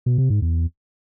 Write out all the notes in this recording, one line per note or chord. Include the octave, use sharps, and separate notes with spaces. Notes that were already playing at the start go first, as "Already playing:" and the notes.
B2
C3
G#2
E2